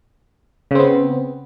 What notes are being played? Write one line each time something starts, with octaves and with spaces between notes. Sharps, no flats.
C#3 B3 C4